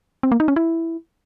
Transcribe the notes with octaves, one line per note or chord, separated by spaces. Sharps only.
C4
A#3
D#4
C#4
E4